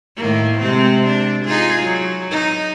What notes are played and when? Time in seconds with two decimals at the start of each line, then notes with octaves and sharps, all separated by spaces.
0.17 A2 D#3 A#3
0.60 C3 G#3 C4
1.07 D4
1.45 D#4 F4 G#4
1.82 F#3
2.31 D#4